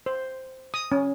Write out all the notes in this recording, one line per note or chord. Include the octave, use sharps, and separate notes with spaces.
C5
D#6
C#4